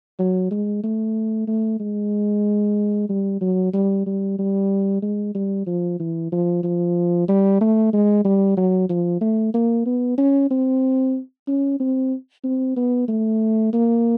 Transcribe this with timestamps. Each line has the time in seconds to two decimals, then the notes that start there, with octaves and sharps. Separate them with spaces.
0.19 F#3
0.51 G#3
0.84 A3
1.47 A3
1.80 G#3
3.09 G3
3.41 F#3
3.73 G3
4.06 G3
4.39 G3
5.02 G#3
5.35 G3
5.66 F3
6.00 E3
6.32 F3
6.63 F3
7.29 G3
7.61 A3
7.93 G#3
8.25 G3
8.57 F#3
8.90 F3
9.21 A3
9.54 A#3
9.86 B3
10.18 C#4
10.51 C4
11.47 C#4
11.80 C4
12.44 C4
12.76 B3
13.08 A3
13.73 A#3